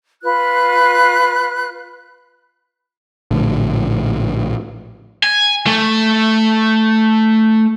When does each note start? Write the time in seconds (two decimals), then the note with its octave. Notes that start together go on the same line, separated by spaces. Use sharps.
0.23 F4 B4 F#6
3.31 A#1 A2 D3
5.23 G#5
5.67 A3